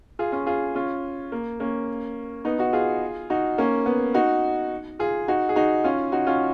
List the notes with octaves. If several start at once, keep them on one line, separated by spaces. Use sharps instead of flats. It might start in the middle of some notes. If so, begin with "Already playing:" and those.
F4 G#4
C#4 F4
F4 G#4
C#4 F4
A#3
A#3 C#4
B3 D#4
D#4 F#4
F4 G#4
D#4 F#4
A#3 C#4
B3
D#4 F#4
F4 G#4
D#4 F#4
G#4
D#4 F#4
C#4 F4
D#4 F#4
C#4 F4